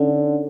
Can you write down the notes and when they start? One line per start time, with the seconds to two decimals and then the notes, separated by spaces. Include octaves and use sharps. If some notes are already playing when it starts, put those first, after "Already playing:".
Already playing: D3 C#4 D#4